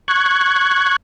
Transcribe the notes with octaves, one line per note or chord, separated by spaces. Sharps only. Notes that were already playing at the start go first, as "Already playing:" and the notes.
C#6 F#6 G#6